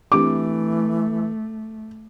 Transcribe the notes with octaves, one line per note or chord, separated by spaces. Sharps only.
E3 A3 C4 D4 G4 D6